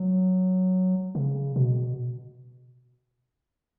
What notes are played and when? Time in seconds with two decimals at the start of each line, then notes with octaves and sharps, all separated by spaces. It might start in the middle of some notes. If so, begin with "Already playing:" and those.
Already playing: F#3
1.15 C#3
1.56 B2